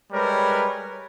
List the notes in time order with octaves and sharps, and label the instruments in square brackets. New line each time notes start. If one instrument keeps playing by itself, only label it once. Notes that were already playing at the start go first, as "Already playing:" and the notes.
[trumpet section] G3 G#3 A#4 B4 C#5